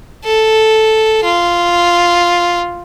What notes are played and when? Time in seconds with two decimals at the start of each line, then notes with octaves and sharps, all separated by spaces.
0.24 A4
1.23 F4